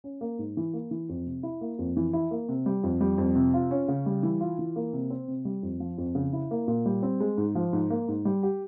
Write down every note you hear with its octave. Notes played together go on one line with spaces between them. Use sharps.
C#4
A#3
G#2
E3
A#3
E3
F2
C3
E4
A#3
F2
E3
E4
A#3
C3
G3
F2
G3
F2
C3
F4
C#4
C#3
G3
E3
F4
E3
A#3
C3
C4
C3
G3
F2
F3
F2
C#3
E4
A#3
A#2
G3
C4
G#3
G#2
F3
G#2
A#3
G#2
G3
G4